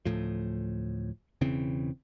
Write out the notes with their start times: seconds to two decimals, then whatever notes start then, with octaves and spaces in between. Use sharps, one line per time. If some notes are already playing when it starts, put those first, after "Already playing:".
0.06 D1 G#1 A2 F3
1.41 E1 C#3 E3 C4